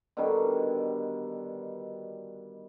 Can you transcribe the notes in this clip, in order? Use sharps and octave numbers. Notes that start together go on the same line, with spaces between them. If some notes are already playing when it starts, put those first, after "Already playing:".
B2 D3 D#3 G3